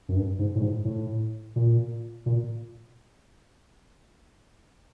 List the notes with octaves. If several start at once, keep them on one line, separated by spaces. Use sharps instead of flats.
F#2
G2
G#2
A2
G#2
A2
A#2
A#2